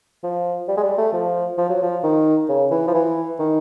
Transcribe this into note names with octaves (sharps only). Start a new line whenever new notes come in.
F3
G3
G#3
G3
A3
F3
F3
F#3
F3
D#3
C#3
E3
F3
E3
D#3